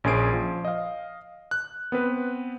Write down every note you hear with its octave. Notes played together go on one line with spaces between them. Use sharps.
A#1 C#4 G#4 C7 D7
F3
D#5 F5
F#6
B3 C4 B4